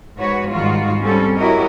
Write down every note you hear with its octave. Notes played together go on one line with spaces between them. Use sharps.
G#2 F#4 B4 C#5
G#2 D#3 G3 F4 F#4
G3 C4 C#4 A4
E4 F#4 G4 A#4 C#5 D#5